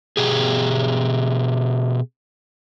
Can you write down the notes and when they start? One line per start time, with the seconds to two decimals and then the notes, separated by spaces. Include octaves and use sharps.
0.17 B2 G4 G#4